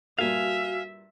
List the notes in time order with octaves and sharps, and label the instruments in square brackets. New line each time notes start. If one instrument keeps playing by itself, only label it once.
[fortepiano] G2 A#2 A#3 [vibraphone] F#4 [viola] E5 [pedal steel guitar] F5 G#5